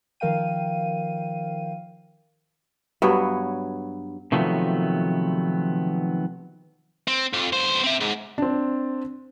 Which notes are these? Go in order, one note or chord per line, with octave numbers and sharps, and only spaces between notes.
D#3 F3 A#4 F5 G5 D#7
G2 F#3 B3 C#5
C3 D#3 F3 F#3 A3 B3
C4
F2
B1 C5
C4 E5
G#2
C4 D4